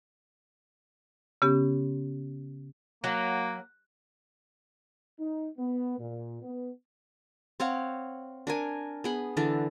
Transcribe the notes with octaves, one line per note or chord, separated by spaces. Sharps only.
C#3 B3 C#4 G4
F#3 A#3
D#4
B3
A#2
B3
C4 C#5 F5 F#5
D4 A#4 G#5
B3 G#4 B5
D3 E3 D4 A4